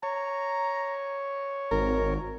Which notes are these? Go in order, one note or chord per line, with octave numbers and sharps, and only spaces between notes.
C#5 A#5
G#1 A#4